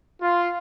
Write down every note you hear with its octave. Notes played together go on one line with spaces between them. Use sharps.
F4